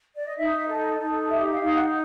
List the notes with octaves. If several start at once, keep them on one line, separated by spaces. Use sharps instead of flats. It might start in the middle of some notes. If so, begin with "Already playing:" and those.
D5
D#5
D#4 E5
A4
D#4
G4 E5
F5
D#4
F5
F#5